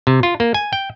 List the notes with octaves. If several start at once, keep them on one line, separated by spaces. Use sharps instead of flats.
C3
F4
A#3
G#5
G5